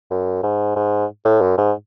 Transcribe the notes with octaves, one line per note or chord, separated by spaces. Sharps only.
F#2
G#2
G#2
A2
F#2
G#2